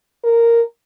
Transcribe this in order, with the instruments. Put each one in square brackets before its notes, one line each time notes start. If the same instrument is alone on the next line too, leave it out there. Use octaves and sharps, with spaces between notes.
[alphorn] A#4